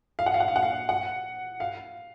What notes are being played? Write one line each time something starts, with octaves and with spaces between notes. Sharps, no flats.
F5
F#5
F5
F#5
F5
F#5
F5
F#5
F5